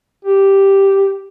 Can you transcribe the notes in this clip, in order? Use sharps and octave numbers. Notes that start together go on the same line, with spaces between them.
G4